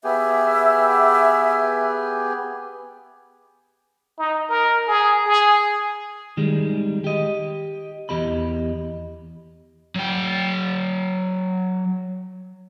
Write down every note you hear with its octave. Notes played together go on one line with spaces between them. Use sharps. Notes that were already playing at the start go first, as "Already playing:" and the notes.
B3 G4 G#4 E5
D#4
A#4
G#4
G#4
D#3 G3 G#3
G4 D#5
E2 G4 D#5 B5
F#3 G5